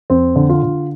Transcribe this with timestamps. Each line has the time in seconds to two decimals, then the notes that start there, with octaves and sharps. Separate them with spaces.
0.10 F2 C4
0.36 D3
0.49 F4
0.63 D3